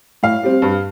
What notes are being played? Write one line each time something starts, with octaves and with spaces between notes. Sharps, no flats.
A2 F5
G3 C4
G2